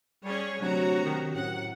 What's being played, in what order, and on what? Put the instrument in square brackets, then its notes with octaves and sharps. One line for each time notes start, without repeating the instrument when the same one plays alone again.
[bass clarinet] G3 [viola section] C#4 G#4 C#5
[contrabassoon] D2 [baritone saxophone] C3 [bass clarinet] F#3 [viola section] F#4 A#5
[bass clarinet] D#3
[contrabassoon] F#2 [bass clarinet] A2 [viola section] F#5